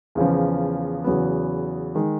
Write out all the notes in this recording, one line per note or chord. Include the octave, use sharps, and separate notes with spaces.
E2 C#3 F3
E2 C#3 F#3 B3
D#3 G#3